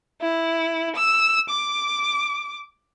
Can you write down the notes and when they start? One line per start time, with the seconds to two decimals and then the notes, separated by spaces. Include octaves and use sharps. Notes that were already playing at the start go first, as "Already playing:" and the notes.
0.21 E4
0.95 E6
1.49 D6